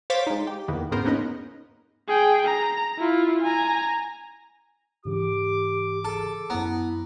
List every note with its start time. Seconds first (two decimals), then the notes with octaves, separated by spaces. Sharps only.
0.10 C5 C#5 F5 D6 A6 B6
0.27 G#3 D#4
0.47 G4
0.68 E2 D#3 A#3 B3
0.91 E2 G#2 C#3 B3 A#4 C5
1.05 A#3 B3 C#4 D#4 B4 D#5
2.08 G#4 G5
2.45 A#5
2.99 E4 F4
3.42 G#5 A#5
5.05 G#2 C#3 E3 G4 D6
6.05 G#4 A4
6.50 F#2 B3 E4 A#5